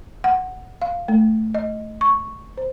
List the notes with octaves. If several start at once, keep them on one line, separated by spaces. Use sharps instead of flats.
F#5
F5
A3
D#5
C#6
C5